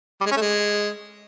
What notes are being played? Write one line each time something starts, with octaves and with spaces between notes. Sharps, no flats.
G3
G#3
C#4
A3
G#3